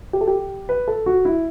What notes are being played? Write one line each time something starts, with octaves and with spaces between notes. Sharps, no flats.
G4
A4
G4
B4
A4
F#4
E4